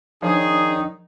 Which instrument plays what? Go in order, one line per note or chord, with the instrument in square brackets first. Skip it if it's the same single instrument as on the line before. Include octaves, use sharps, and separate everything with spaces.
[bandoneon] D#3 D#4 [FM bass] F3 [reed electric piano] D4 C#5 D5 [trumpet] G#4